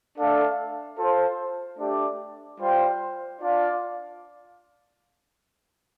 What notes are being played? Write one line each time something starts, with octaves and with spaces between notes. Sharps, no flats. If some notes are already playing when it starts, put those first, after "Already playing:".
A3 D4 A4 F5
F4 A4 C5
A3 D4 G4 D5
G3 F4 C5 G5
D4 F4 D5 F5